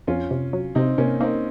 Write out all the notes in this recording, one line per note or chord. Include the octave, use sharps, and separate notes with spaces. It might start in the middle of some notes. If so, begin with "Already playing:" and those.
F2 C#4 F4
C3
F#3
C3 C4 D#4
C3 A#3 C#4
A#3 C4 D#4